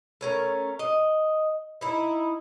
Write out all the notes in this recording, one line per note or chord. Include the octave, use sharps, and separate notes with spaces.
A3 C#4 A#4
D#5
D#4 E4